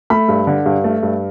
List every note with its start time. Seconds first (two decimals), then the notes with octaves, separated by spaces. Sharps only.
0.10 A3 B5
0.29 G2
0.47 D3
0.66 G2
0.84 A3
1.03 G2